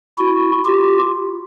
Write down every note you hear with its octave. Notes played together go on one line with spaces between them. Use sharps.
E4 F#4
F4 G4